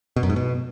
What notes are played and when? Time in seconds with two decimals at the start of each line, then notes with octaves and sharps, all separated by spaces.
0.16 B2
0.23 F#2
0.30 G#2
0.36 B2